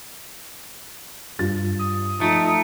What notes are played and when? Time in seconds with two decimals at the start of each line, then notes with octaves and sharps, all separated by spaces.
1.39 G2 F4 A6
1.79 D#6
2.21 F3 A3 D#4